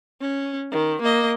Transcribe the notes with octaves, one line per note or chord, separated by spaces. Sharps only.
C#4
D#3
A#3 D#5